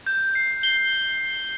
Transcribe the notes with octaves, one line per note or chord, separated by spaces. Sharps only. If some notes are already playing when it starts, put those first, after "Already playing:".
G6
C7
G7